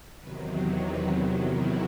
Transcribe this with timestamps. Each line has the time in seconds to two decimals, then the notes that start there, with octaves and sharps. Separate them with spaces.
0.18 E2 C3 D#3 F#3 B4
0.51 C5
0.81 B4
1.45 E4